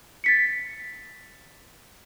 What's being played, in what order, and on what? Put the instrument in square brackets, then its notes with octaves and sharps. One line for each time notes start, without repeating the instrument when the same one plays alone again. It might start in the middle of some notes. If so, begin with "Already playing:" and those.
[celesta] A6 B6 C#7